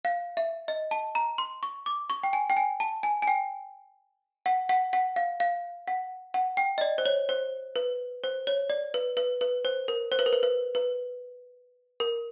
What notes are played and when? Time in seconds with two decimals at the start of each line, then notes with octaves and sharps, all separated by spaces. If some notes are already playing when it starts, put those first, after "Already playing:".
0.05 F5
0.37 E5
0.68 D#5
0.91 A5
1.15 A#5
1.38 C6
1.63 C#6
1.86 D6
2.10 C#6
2.23 G5
2.33 G#5
2.50 G5
2.57 G#5
2.80 A5
3.03 G#5
3.22 G#5
3.27 G5
4.46 F#5
4.69 F#5
4.93 F#5
5.16 F5
5.40 F5
5.88 F#5
6.34 F#5
6.57 G5
6.78 D#5
6.81 D5
6.98 C5
7.06 C#5
7.29 C5
7.76 B4
8.24 C5
8.47 C#5
8.70 D5
8.94 B4
9.17 B4
9.41 B4
9.65 C5
9.88 A#4
10.12 C5
10.19 B4
10.26 A#4
10.33 B4
10.43 B4
10.75 B4
12.00 A#4